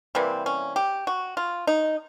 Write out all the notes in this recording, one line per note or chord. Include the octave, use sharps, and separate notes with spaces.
C3 E3 G3 A#3 C4
C#4
G4
F#4
F4
D#4